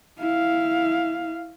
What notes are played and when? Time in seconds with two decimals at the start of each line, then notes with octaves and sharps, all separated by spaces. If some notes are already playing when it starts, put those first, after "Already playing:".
0.18 E4 F5